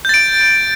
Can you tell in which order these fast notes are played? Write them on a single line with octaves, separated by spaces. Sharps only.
G6 A6 D7